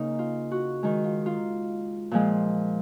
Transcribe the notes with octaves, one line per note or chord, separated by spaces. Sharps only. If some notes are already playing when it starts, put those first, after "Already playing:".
Already playing: C#3 A#3 D#4
F4
F#4
D#3 G#3 D#4
F4
F4
A#2 F3 G#3